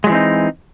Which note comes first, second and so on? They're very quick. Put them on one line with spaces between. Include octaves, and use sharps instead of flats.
G#3 F#3 E3 C4 D#4